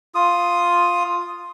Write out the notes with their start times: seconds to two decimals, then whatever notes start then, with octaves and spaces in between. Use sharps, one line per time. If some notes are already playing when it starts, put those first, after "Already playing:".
0.15 F4 D#6